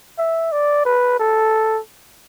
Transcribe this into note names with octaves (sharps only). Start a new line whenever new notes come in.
E5
D5
B4
A4